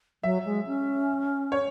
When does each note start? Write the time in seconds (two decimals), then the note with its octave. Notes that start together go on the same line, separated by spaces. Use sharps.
0.23 F#3 E5
0.45 G#3
0.67 C#4
1.52 C#5